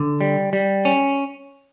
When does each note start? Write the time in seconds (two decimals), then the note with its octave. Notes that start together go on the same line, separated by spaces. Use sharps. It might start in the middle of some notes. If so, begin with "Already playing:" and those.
Already playing: D3
0.21 G3
0.53 G3
0.85 C#4